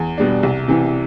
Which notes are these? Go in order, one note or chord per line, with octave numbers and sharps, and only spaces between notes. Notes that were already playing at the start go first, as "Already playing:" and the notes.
Already playing: E2
B2 G3 D4
C2
C3 E3